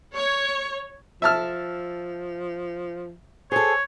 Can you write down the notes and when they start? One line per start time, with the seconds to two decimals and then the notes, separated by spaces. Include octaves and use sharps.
0.15 C#5
1.22 F3 E5 A5 F6
3.52 G#4 A4 C5 C#5